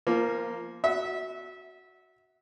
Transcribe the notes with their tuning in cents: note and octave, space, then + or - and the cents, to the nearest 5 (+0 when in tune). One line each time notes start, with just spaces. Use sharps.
F3 -20 A#3 +0
F#4 +0 E5 -25